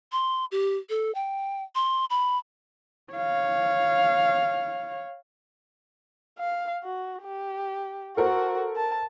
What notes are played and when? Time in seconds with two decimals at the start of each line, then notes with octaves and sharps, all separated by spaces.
0.12 C6
0.52 G4
0.90 A4
1.15 G5
1.75 C6
2.10 B5
3.13 C#5 F5
6.39 F5
6.84 F#4
7.23 G4
8.17 F#4 A4 A#4 C5
8.76 A5